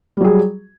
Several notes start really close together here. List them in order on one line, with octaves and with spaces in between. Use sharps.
G3 F#3 G#4